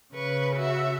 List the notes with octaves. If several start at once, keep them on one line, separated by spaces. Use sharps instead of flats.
C#3 B4 C#6
F#4 E5